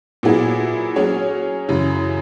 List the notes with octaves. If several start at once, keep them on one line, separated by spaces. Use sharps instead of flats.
A#2 F#3 B3 E4 G#4
F#3 C#4 G#4 C#5
F#2 C#3 E3